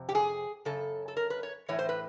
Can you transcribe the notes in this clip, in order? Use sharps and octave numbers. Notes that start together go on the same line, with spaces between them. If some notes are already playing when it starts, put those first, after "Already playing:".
Already playing: F2 C3
G4
G#4
F#2 C#3 A4
A4
A#4
B4
C#5
A2 E3 C#5
C5
B4